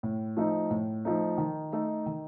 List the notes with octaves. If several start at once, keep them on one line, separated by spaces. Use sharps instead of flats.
A2
F3 A3 D#4
A2
F3 A3 D#4
D#3
A3 D#4
D#3